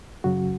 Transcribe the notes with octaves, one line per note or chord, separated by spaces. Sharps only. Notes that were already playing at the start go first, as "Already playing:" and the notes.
F#2 C#3 F#3 F#4